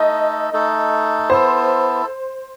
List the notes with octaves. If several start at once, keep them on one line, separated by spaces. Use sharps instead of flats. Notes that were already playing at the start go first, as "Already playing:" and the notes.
Already playing: A3 D#4 A4 D#5
A3 D#4 A4
B3 E4 A4 C5